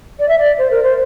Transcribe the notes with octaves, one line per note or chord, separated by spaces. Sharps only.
D5
E5
D5
C5
A#4
C5